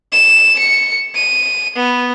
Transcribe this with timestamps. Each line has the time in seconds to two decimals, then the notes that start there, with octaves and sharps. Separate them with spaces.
0.12 E7
0.59 C#7
1.15 D#7
1.76 B3